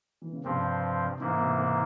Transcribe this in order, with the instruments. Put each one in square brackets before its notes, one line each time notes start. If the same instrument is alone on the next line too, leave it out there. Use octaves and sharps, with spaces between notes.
[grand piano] E3
C#3
[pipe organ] G2 F3 C4 [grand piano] C3
[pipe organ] G#2 E3 A#3 E4 [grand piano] C#3
[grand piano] C3
C3